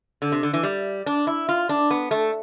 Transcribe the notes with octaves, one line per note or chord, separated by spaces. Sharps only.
D3
C3
D3
E3
G3
D4
E4
F4
D4
B3
A3